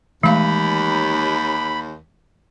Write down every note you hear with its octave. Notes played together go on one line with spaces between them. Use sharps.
D#2 E3 G#3 A3 F5 B5